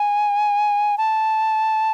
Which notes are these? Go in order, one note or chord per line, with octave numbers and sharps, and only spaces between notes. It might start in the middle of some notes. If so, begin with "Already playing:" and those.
Already playing: G#5
A5